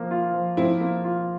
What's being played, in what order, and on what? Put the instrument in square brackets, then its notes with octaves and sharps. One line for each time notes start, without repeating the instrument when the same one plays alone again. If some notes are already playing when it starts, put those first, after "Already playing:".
Already playing: [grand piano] F3 A#3
F4
F3
[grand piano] F3 [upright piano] C4 E4
[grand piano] A#3
F4